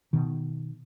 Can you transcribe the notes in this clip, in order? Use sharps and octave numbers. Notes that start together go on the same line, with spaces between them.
B2 D#3